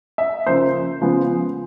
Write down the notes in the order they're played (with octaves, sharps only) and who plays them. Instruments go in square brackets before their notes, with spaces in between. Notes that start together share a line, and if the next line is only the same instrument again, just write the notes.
[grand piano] E5
C#3 F3 A#3 C5
C#3 F3 G#3 B3